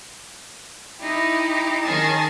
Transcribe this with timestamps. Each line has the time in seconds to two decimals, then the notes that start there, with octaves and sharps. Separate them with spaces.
1.00 D#4 E4 G4
1.83 D#3 C#4 G#4 A5